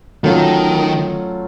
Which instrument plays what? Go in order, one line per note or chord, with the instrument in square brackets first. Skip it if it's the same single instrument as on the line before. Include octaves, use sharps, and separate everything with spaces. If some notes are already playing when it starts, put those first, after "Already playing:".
[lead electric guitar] D#3 [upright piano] F#3 A3 C#4 F4